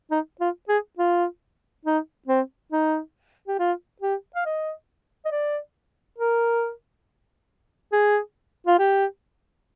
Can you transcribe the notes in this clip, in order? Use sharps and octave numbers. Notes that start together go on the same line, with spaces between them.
D#4
F4
G#4
F4
D#4
C4
D#4
G4
F4
G4
F5
D#5
D#5
D5
A#4
G#4
F4
G4